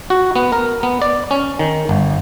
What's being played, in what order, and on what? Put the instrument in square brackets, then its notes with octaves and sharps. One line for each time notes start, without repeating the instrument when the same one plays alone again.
[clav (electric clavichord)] F#4
B3
A#4
B3
D5
C#4
D#3
G1